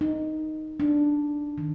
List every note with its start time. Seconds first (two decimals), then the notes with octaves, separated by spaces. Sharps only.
0.01 D#4
0.80 D4
1.58 D#3